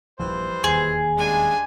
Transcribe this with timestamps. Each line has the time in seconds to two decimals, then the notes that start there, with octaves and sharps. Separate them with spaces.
0.19 D#1 A#1 E3 F3 G3 C5
0.64 E1 D#2 G#4
1.18 C#3 G3 G#3 D4 G#5